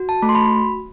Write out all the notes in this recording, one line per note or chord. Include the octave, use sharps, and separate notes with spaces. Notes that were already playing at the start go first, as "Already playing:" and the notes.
Already playing: F#4
A5
A3
C6
B5